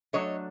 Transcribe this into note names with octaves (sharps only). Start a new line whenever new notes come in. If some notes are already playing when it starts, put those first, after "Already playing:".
F#3 A3 D4 C#5 D#5